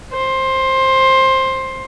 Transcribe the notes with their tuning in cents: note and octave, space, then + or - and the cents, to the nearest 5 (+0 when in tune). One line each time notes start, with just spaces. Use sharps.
C5 +15